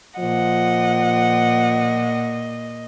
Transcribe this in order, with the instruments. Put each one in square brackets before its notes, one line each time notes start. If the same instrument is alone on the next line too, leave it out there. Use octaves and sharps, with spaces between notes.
[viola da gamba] A#2 [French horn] F3 [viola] D#5 [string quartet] F#5